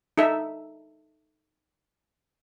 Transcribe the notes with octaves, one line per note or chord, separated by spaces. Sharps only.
D#4 A4 E5